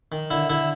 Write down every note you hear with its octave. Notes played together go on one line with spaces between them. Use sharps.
D#3
D3 E4
D3 E4